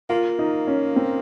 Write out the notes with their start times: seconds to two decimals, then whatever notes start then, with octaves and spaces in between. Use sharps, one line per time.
0.10 A#3 F4
0.39 D#4
0.67 C#4
0.96 C4